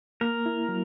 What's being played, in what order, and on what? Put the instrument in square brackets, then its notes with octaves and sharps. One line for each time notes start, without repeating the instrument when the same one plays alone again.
[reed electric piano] A#3 [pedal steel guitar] A#4
[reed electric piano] E4
F#3